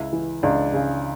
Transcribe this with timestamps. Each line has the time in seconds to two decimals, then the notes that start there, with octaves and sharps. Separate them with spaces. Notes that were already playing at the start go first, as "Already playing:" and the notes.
Already playing: C#2 E4
0.13 E3
0.43 C#2 D4
0.73 C#3